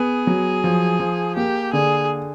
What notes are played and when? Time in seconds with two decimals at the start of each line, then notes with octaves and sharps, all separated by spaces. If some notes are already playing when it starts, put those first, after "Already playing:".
Already playing: B3 G#4
0.27 F#3
0.64 F3
1.00 F3
1.36 A#3 G4
1.73 D3 G#4